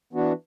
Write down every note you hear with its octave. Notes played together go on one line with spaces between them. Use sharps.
E3 B3 D4 F#4